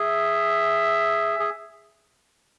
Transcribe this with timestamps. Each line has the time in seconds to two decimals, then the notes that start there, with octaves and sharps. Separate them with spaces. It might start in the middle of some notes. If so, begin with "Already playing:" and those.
Already playing: G#4 E5
1.39 G#4